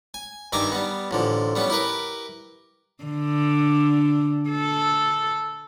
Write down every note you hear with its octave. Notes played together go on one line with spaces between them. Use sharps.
G#5
G2 D#3 E5 G#5 A#5 D6
G3 B3
A1 D3 F3
G3 B3 C#4
E4 G4 A#4 B4
D3
A4